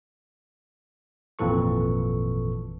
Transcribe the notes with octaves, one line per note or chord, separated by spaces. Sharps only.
G#1 F2 A#2 E3 A4 C#6